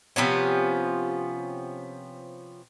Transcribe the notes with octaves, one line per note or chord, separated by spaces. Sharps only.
C3 F3 B3 C#4